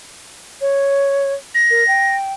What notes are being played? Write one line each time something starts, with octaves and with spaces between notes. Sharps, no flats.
C#5
A#6
A#4
G5